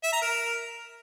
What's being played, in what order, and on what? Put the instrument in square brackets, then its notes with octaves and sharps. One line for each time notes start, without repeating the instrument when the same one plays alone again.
[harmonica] E5
A#5
A#4